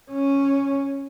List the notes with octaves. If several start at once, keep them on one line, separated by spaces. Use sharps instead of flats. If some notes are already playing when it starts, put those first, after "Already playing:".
C#4